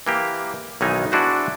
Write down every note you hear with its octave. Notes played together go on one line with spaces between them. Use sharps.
E3 A#3 G4
B1 D#3 E3 D#4 G#5
D4 E4 F#4 G#4 C5